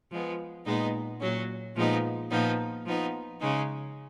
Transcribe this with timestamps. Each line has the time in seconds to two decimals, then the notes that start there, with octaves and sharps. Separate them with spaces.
0.12 F3 G#3 B3
0.66 A#2 G#3 B3 D#4
1.21 A#2 F#3 C#4
1.75 A#2 F3 G#3 B3 D#4
2.31 A#2 F3 B3 D#4
2.86 F3 B3 D#4
3.41 C#3 G#3 D#4